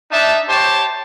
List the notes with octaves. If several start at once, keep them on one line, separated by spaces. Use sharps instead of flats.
D4 D#4 E5 A5
G4 C5 C#5 A5